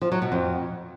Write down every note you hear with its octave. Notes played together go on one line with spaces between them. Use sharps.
F3
F#3
B2
F2